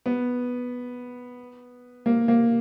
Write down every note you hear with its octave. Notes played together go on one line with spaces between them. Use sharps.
B3
A#3
A#3